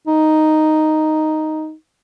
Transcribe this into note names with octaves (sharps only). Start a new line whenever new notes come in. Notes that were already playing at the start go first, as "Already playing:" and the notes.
D#4